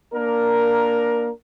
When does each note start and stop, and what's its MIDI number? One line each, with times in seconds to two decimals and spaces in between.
0.14 1.31 58
0.14 1.31 62
0.14 1.31 70